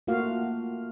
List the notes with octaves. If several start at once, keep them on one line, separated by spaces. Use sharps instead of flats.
A3 A#3 F4 F#4 F5